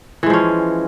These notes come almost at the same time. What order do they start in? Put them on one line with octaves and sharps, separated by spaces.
E3 G#3 F3 C#4